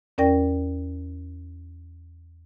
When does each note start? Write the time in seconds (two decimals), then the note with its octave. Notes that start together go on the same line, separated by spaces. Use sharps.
0.18 E2 C#4 A#4 D5 G5 A#6